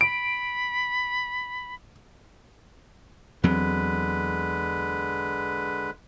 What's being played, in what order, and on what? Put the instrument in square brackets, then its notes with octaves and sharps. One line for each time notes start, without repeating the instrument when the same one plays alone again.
[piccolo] B5 [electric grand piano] D7
[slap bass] E2 F#3 C4 [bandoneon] D3 G#3 B4